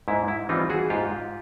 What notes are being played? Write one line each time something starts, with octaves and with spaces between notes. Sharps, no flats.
G#2 E4
E4
E3 G3 C4 D#4 F4
F#4 G#4
G#2 F4 G4